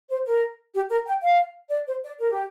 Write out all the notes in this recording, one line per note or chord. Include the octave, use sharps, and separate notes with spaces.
C5
A#4
G4
A#4
G5
F5
D5
C5
D5
A#4
G4